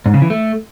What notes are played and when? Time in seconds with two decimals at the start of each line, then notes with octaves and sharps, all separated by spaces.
0.06 G#2
0.14 C#3
0.22 E3
0.30 A3